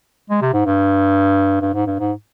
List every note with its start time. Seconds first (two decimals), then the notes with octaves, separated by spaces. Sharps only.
0.30 G#3
0.42 C3
0.53 G#2
0.65 G2
1.61 G2
1.74 G#2
1.86 G2
1.99 G#2